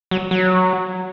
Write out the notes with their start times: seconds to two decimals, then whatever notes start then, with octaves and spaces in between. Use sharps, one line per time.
0.11 F#3
0.31 F#3